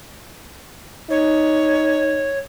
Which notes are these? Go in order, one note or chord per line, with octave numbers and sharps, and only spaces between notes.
D#4 C#5